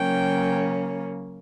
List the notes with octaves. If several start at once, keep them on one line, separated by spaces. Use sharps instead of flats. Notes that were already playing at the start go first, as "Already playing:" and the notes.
Already playing: C#3 F#3 A#3 C#4 G5